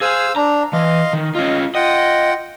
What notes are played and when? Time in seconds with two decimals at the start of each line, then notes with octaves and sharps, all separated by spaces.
0.01 G#4 C5 F5 G#5 E6
0.36 D4 A#5
0.73 E3 D#5 F5 C6
1.13 D#3
1.35 C#4 F4 D#5
1.75 F4 D#5 F#5 G5